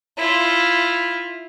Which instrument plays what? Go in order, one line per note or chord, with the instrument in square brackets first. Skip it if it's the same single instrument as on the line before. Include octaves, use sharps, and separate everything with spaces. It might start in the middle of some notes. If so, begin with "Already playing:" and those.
[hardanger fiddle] E4 F4